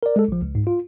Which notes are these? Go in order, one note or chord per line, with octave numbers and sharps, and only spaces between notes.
A#4 D5
G#3 A4
A#1 F3
C#2
G#2
F4